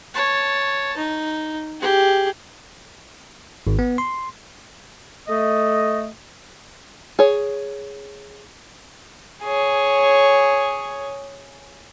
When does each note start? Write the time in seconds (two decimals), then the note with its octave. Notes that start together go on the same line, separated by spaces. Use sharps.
0.14 C#5 A5
0.97 D#4
1.80 G4 G#4
3.67 G#1
3.79 B3
3.98 C6
5.28 A3 D#5
7.19 G#4 C#5
9.43 G#4 C#5